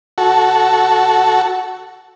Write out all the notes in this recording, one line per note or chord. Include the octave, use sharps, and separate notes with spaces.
F#4 A4